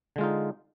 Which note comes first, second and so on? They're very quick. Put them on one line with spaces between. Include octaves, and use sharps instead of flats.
D3 G#3 F4 D#4